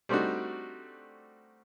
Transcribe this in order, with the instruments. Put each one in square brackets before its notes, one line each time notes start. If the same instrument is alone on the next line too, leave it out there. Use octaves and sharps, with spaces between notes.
[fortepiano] G3 A3 C4 D4 D#4 F#4